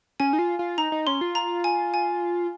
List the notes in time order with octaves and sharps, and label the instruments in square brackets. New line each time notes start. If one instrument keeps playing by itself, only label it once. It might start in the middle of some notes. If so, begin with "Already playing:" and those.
[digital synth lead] C#4 [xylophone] G#5
[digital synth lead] D#4
F4
F4
[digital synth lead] D#4 [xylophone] A#5
[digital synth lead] D#4
[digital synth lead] C#4 [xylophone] C6
[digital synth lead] F4
[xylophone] A#5
G#5
G#5